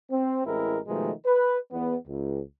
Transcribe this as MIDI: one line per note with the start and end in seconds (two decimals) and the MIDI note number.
0.10 0.44 60
0.45 0.79 33
0.45 0.79 56
0.45 0.79 60
0.45 0.79 64
0.45 0.79 70
0.87 1.11 47
0.87 1.11 51
0.87 1.11 53
0.87 1.11 56
0.87 1.11 57
1.26 1.56 71
1.71 1.95 40
1.71 1.95 59
2.06 2.40 37